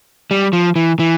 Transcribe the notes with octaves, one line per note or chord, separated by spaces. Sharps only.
G3
F3
E3
E3